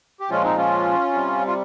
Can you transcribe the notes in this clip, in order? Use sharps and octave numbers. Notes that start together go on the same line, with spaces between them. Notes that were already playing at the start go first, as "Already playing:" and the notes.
G4
A#2 F3 G#3 C#4 F4
C4 D#4
C#4 F4
C3 G3
F4